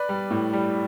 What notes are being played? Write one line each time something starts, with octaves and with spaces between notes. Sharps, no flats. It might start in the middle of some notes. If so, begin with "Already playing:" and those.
Already playing: B4 D5
G3
A2
G3